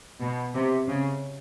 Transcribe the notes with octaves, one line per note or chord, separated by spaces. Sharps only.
B2
C3
C#3